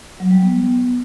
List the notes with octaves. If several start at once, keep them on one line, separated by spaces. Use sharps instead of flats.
F#3
G3
B3